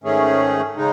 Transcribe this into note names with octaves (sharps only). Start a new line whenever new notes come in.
G#2 D#3 A3 C#4 G#4
C#3 G#3 D#4